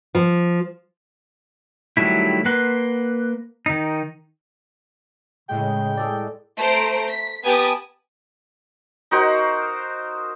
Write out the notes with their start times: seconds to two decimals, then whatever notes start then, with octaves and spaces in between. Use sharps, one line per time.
0.15 F3
1.97 D#3 F#3 G3 A3 E4
2.45 A#3 B4 F#5 C6
3.66 D#3 D#4
5.49 A2 C#3 G#3 G5
5.98 G#4 A4 D5
6.57 A3 C5 A#5 D7
7.10 B6
7.44 B3 G4 G#5 A5 B5 D#6
9.11 D#4 F#4 A#4 C5